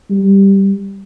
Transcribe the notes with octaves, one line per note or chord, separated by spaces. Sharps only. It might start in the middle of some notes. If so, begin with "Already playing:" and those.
G3